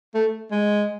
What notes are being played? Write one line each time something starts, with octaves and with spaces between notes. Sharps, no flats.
A3
G#3